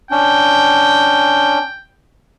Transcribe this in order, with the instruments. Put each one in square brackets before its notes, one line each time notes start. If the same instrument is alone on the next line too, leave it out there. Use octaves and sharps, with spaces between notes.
[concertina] C#4 D4 [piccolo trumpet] G5